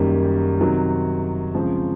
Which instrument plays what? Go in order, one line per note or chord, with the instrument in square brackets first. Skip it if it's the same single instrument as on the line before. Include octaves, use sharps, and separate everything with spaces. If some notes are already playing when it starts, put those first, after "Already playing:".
Already playing: [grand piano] F#2 D#3 G3 A#3
C3 D#3 F#3
C#3 F3 G#3 C4